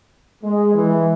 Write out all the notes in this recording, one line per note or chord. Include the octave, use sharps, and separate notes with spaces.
G#3
E3